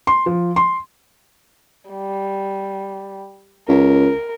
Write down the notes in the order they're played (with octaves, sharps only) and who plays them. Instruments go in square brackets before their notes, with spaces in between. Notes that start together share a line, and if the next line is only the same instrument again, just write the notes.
[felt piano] C6
F3
C6
[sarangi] G3
[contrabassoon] C#2 [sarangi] A#4